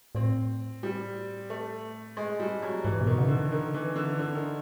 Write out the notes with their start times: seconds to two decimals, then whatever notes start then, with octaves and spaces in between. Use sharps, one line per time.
0.15 A2 C4
0.83 G3
1.50 A3
2.17 G#3
2.40 G3
2.62 F#3
2.84 G#2 E3
3.01 B2
3.07 D#3
3.18 C#3
3.29 D3
3.52 D#3
3.74 E3
3.96 D3
4.19 D3
4.35 D#3